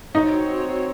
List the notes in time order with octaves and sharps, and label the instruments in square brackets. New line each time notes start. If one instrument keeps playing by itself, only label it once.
[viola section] C4 F#4 C#5 [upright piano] D#4